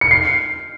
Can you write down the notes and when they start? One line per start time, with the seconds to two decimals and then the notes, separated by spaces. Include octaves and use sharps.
0.01 C#7
0.11 C7